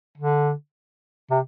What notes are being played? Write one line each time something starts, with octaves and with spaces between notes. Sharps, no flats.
D3
C3